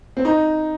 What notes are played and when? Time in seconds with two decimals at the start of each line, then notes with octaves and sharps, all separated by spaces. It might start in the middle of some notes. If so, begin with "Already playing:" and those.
0.17 C4
0.25 D#4